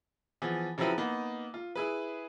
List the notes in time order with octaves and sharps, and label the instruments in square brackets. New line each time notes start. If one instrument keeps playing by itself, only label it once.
[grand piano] E3 F3 B3 G#4
C#3 F3 F#3 C4 E4 B4
A#3 B3 D#4
F4
E4 G#4 B4